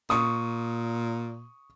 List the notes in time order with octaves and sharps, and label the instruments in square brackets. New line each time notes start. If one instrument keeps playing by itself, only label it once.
[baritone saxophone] A#2 [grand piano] C#6 D#6